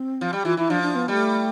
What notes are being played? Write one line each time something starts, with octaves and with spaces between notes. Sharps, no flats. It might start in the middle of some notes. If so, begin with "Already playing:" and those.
Already playing: C4
F3
G3
E3 F4
E3 E4
F3 D4
D4
B3
G3 A3 B3